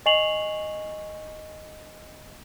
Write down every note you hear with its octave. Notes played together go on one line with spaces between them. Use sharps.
D#5 G#5 C#6 C7 F7 F#7